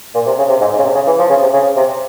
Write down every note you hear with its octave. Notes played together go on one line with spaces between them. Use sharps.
A#2
C3
C#3
C3
G#2
G#2
C#3
C3
C#3
E3
F3
C#3
C3
C#3
C3